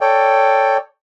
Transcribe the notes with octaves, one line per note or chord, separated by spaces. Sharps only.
A4 C#5 D5 G5